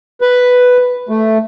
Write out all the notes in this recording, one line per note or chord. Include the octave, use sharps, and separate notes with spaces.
B4
A3